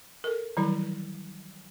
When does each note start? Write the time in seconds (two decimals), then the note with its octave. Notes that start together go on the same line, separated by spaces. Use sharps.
0.24 A4 A#4
0.57 D#3 E3 F#3 G3 E4